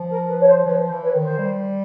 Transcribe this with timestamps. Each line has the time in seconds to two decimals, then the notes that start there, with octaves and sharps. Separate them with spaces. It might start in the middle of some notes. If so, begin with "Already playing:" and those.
Already playing: F3
0.11 A#4
0.29 B4
0.40 C#5
0.47 C5
0.65 F3 B4 C#5
0.83 C5
0.90 E3
1.02 B4 C#5
1.14 D#3
1.20 C5
1.38 G3